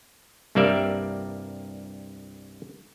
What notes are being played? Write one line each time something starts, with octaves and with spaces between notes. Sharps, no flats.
C2 G2 G3 A#3 D5 E5